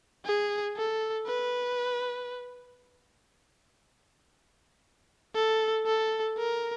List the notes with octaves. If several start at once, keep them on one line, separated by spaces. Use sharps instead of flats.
G#4
A4
B4
A4
A4
A#4